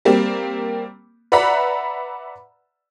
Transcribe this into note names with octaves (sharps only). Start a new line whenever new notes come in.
G3 A#3 C4
B4 D5 E5 F#5 A#5 B5